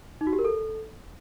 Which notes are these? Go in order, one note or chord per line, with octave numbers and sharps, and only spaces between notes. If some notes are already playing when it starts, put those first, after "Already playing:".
D#4
F#4
G4
A#4
A4